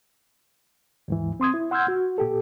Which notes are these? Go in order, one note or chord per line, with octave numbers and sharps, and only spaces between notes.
D#2 G#2 E3
C4 C6 D#6 G#6
E4
F#5 C6 E6 F6 G6 G#6
F#4
A#2 G4 A4